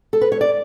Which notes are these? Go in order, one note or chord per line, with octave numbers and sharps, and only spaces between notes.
A4
B4
C#5
D5